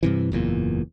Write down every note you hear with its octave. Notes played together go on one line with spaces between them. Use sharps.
G2 C3 E3
F#1 E2 A#2